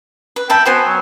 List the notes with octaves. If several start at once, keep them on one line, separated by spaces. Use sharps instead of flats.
B4
E5 G5 A5 B5
B3 F#4 C5 G#5
F#3